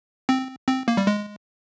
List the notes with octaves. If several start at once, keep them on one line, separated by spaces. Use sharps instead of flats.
C4
C4
A#3
G3
G#3